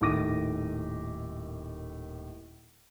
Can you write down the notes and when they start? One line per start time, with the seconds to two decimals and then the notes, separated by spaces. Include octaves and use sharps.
0.01 D#1 A2 D#3 D6 A#6 D#7